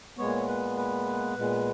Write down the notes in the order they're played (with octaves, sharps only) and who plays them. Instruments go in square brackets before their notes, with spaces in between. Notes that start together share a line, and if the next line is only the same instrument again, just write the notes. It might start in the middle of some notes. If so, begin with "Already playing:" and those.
[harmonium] A#2 G#3 B3 C#5
B4
B4
A#2 G#3 B3